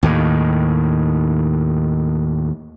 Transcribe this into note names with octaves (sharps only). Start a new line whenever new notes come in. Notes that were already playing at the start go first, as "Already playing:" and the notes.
D#2 A2 D#3